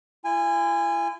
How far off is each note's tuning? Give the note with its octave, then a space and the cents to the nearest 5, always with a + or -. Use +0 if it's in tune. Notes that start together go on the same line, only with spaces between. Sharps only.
E4 +45 G#5 -20